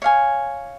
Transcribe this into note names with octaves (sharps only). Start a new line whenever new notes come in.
C#5 F5 G#5